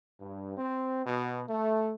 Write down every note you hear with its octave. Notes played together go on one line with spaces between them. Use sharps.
G2
C4
B2
A3